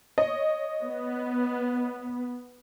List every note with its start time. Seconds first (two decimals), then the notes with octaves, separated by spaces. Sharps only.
0.18 C#5 D#5
0.84 B3